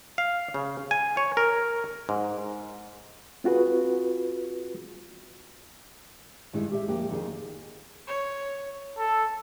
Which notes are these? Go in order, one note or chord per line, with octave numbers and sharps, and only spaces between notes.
F5
C#3
G#5
C#5
A#4
G#2
C4 F4 F#4 G#4 B4
G2 D#3 G#3 E4
G4 E5
F2 A#3 G4
F2 D#3 G#4
C#5
A4